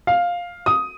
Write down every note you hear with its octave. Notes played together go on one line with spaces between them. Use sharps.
F5
D#6